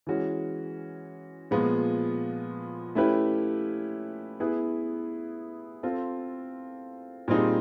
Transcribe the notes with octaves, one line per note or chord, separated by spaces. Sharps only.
E3 G#3 C#4 F#4
A#2 F3 G#3 B3
A3 C#4 E4 G4 B4
B3 E4 G#4 B4
C4 F4 A4
A#2 G3 C4 D#4 G#4